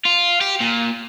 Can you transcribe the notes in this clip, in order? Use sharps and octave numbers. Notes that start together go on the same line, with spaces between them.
F4
G4
A#2